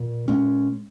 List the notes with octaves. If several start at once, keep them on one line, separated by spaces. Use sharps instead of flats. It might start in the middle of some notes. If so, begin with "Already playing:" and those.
Already playing: A#2
A#2 G#3 C#4